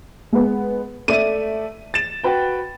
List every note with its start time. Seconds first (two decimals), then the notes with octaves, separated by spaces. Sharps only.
0.32 G#3 B3
1.08 A3 D5 E5 D#7
1.94 A6 E7
2.24 F#4 B4 G5